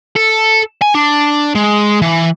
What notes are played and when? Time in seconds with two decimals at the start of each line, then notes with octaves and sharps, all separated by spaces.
0.16 A4
0.82 G#5
0.95 D4
1.55 G#3
2.02 E3